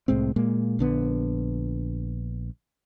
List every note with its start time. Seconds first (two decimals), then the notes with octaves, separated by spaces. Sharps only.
0.08 C2 A2 G#3 C4
0.36 A#2 G#3 A#3
0.79 A#1 D3 B3